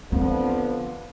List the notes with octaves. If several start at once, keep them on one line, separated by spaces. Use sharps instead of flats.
D3 F3 B3 C4